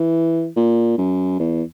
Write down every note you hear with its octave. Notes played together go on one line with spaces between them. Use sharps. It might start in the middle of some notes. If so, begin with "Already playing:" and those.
Already playing: E3
A#2
F#2
E2